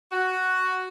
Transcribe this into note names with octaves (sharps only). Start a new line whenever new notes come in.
F#4